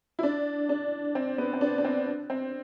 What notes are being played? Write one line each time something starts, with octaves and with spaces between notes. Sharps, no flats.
E4
D4
D4
C4
B3
C4
D4
D4
C4
C4